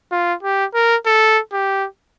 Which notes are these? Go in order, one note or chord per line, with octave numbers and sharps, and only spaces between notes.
F4
G4
A#4
A4
G4